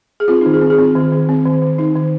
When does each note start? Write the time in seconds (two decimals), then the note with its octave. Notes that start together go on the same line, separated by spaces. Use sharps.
0.20 G#4
0.28 C4 F4
0.41 D#3 D#4
0.54 G#4
0.61 C4
0.70 G#4
0.78 C4 F4
0.96 D#3
1.12 D#3
1.29 C4
1.45 D#3
1.62 D#3
1.78 D#3 D#4
1.95 D#3